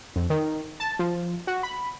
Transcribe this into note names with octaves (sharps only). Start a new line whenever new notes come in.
F2
D#3
A5
F3
F#4
B5